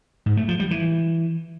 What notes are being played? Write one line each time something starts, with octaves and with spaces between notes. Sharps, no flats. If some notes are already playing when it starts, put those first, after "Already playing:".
G#2
A3
F3
G3
E3